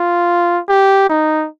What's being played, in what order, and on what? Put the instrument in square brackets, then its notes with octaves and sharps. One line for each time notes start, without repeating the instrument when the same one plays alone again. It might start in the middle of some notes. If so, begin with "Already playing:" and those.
Already playing: [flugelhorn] F4
G4
D#4